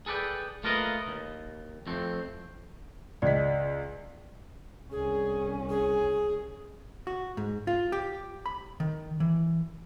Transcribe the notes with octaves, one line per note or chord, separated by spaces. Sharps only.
G#4 A4 B4 D5 G5
A3 A#3 F4 A#4 B4 D#5
D#2
F2 A3 C4
C#2 D5 D#5 B6
C2 C#4 G#4
G#4
F#4
G#2
F4
G4
B5
D#3
E3